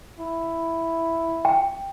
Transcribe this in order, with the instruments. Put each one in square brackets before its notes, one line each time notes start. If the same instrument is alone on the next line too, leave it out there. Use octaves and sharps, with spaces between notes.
[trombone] E4
[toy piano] G5